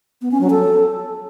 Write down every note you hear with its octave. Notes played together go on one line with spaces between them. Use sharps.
B3
C#4
F#3
A4